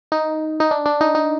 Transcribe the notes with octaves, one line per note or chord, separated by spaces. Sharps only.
D#4
D#4
D4
D4
D#4
D#4